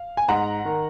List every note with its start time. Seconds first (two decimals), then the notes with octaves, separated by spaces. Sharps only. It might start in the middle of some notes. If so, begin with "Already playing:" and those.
Already playing: F5
0.17 G#5
0.28 G#2 F#5 A#5
0.65 D#3